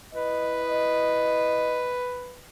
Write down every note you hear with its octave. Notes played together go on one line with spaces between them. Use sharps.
E4 B4 D#5